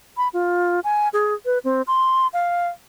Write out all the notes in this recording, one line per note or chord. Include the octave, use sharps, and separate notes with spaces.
B5
F4
G#5
G#4
B4
C4
C6
F5